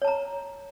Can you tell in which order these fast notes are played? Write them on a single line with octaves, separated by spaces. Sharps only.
C#5 A5 A#5